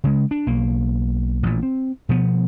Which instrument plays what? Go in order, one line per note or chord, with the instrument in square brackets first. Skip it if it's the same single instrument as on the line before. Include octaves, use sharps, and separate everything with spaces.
[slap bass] C#3 G#3
D4
B1 A#3
A1 A#2
C4
B2 F3 B3